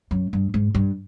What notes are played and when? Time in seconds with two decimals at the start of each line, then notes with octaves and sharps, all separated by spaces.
0.11 F#2
0.33 G2
0.54 G#2
0.75 G2